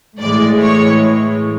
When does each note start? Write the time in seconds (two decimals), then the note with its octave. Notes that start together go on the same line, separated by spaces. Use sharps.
0.21 A2 E3 G#3 D5
0.60 C#5